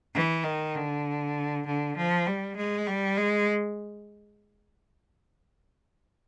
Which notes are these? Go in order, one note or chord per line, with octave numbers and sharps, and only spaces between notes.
E3
D#3
D3
D3
F3
G3
G#3
G3
G#3